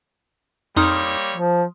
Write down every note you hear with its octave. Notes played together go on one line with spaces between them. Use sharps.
F2 G3 A#3 D#4 C#5 C6 D#6 F6
F3